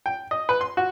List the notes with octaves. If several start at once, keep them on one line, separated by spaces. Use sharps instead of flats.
G5
D#5
B4
C6
F#4